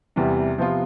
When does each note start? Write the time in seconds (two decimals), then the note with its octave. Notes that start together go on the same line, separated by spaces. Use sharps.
0.16 E2 C3 E3 G3
0.58 C3 F3 B3 F4